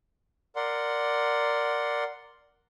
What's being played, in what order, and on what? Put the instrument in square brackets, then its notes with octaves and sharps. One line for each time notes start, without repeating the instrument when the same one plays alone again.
[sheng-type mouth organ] A#4 D5 F#5 C6